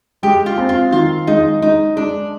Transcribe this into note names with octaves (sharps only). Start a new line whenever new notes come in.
G#3 G4
F4
C4
F4
D#3 F4
G#3 D#4
G#3 D#4
G#3 D4